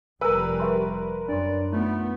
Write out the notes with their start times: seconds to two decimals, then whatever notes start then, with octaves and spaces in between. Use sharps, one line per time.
0.21 F1 G3 A#4 B4 G#5 E6
0.60 G4 E5 C6
1.28 F#2 D4 D5 C6
1.72 A3 B3 D#4 F4